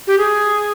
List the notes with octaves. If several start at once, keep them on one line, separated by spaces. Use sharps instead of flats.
G4
G#4